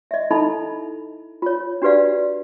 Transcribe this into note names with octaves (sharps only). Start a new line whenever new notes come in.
D#5 E5
D#4 E4 A4 D#5 A5 B5
F4 C#5
D4 F#4 G4 B4 D5 F5